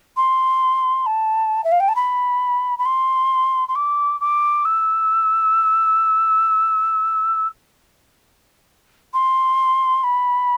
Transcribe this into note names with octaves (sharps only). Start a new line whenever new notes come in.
C6
A5
E5
F5
G5
A5
B5
B5
C6
C6
D6
D6
E6
C6
B5